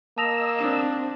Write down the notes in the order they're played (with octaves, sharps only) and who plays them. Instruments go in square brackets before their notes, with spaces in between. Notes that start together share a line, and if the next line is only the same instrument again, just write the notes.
[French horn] A#3 [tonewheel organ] D#5 E6 [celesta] A5 A#6 F7
[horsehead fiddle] C4 D4